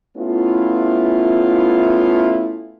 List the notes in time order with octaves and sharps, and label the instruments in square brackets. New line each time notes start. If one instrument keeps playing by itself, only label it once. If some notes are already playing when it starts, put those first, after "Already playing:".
[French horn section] A3 B3 C#4 E4 F4